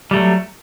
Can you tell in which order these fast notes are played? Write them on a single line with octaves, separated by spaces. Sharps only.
G3 A3 F#3